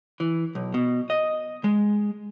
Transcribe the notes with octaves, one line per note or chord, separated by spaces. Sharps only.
E3
B1
B2
D#5
G#3